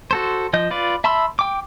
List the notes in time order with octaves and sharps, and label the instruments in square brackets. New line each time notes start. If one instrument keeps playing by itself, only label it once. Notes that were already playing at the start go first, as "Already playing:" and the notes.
[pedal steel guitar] F#4 A4 C5
F3 D#5 G6
F4 B4 D5
E5 A5 B5 C6 E6
G5 D6